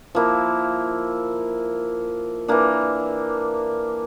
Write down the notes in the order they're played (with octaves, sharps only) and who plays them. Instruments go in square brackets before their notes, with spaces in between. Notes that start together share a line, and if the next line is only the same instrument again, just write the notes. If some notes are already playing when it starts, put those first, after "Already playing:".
[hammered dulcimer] F3 A#3 E4
E3 A#3 D4